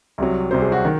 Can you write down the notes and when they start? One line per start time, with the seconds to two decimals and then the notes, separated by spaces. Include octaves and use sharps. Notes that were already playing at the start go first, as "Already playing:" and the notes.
0.18 C2 C3 F#3
0.51 C2 C3 F#3 C5
0.62 G#4
0.72 F#4
0.85 D#3